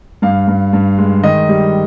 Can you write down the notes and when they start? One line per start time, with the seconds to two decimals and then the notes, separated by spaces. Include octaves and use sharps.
0.22 G2 F5
0.48 G2
0.73 G2
0.98 G#3
1.23 D#3 D#5
1.49 G3